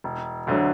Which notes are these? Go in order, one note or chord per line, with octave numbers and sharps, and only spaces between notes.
E1
D2 D3 F#3